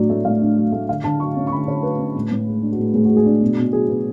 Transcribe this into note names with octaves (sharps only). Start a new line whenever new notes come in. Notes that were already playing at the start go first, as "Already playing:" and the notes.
Already playing: A2 F#3 D4 D5
A3
A2 F5
D4
F#3
A3
D3 F5
D3 A5
F#3 C#6
C#4
C#6
D3 B5
D3 C#5
F#3 B4
C#4
A2
A2
G#3
D4
F#4
A2 G#4
A2 G#4
G#3 F#4
G#4
D4
B2
B2
F#3 G#4
B3